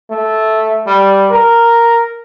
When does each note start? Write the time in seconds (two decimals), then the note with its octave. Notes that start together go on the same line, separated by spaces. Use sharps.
0.10 A3
0.87 G3
1.30 A#4